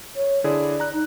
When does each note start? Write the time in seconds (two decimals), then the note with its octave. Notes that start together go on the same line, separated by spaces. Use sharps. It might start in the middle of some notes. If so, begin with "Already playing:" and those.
0.16 C#5
0.44 D3 E4 G#4 D5
0.80 A#5 F#6
0.93 D#4